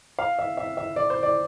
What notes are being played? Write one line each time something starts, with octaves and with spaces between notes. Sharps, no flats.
F5
E5
E5
E5
D5
C5
D5